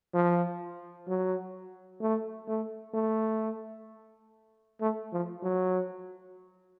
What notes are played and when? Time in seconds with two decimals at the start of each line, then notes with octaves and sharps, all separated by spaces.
0.14 F3
1.08 F#3
2.01 A3
2.48 A3
2.94 A3
4.81 A3
5.13 F3
5.43 F#3